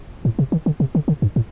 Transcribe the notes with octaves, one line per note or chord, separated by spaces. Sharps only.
A2
C3
D#3
D3
C3
D3
D3
G2
A2